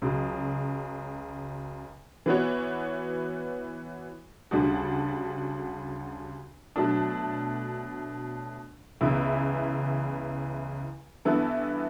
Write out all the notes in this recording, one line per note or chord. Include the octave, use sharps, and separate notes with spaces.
C#2 C#3 F#3
E3 B3 F#4 C#5
D2 C#3 G3 D4 F#4
B2 F#3 A3 D4
C#2 C#3 E3 B3 E4
G2 E3 B3 E4 A4